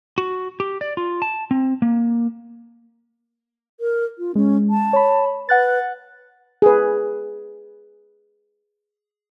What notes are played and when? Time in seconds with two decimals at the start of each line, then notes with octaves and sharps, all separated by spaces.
0.18 F#4
0.60 G4
0.81 D5
0.97 F4
1.22 A5
1.51 C4
1.82 A#3
3.80 A#4
4.18 F4
4.35 G#3 C#4
4.70 A5
4.93 C#5 B5
5.49 B4 F#5 F#6 A6
6.62 G#4 B4